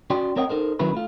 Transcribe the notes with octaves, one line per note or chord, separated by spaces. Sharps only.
C#4 F#4 D5 G5 C6
C4 A#4 C#5 D#5 F#5 G5
D#4 A4 A#4 C5
D#3 F#3 C#4 E4 A#4 B4
A3 F4